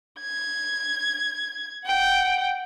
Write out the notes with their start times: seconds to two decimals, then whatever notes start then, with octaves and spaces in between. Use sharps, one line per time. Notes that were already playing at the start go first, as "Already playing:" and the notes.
0.21 G#6
1.86 F#5 G5